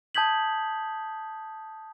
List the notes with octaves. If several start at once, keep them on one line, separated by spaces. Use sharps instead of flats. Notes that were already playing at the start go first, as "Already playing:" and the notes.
A5 D#6 G6 G#6 B6 F#7